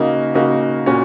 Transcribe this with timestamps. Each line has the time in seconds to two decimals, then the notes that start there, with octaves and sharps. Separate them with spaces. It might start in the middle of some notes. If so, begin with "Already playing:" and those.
Already playing: C#3 A#3 D#4 F#4
0.35 C#3 A#3 D#4 F#4
0.86 A#2 A#3 C#4 F#4